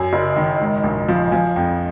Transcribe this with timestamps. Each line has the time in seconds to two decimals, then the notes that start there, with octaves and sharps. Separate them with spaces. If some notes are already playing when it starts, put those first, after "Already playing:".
Already playing: F#2 G#5
0.13 F#1
0.36 D#3
0.60 G#2
0.84 A#1
1.08 F3
1.32 F3 G#5
1.56 F2